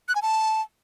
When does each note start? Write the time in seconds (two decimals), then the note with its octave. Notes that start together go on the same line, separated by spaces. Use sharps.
0.08 F#6
0.15 G#5
0.22 A5